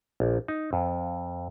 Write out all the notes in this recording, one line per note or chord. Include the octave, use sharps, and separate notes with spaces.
A#1
D#4
F2